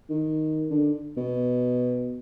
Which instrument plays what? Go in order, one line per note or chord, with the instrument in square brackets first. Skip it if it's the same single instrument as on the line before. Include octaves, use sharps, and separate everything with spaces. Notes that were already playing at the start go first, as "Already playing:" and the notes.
[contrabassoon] D#3
D3
B2